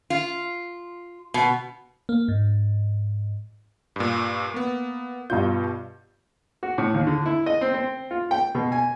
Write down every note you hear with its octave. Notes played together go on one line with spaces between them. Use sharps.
F4
B2
A#3
G#2
G2 A#2
A#3 B3
G2 B2 F4 G6
F#4
A2
D#2
D3
E4
D#5
C4
C4
F4
G5
B2
G#5